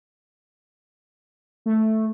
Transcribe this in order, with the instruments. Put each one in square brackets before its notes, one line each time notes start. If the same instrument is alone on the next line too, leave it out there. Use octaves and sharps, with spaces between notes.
[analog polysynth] A3